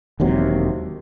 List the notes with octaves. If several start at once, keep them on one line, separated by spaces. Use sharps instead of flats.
E1 D#2 C3 F#3